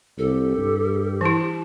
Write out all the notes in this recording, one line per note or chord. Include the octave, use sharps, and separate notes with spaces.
C2 G4 A4
G2
E3 E4 A5